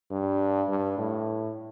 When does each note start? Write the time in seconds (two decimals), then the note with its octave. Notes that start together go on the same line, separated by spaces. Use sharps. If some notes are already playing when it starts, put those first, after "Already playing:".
0.10 G2
0.69 G2
0.98 A2